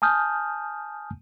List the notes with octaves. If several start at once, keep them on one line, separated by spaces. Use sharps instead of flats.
G#5 A5 D#6 F6 G6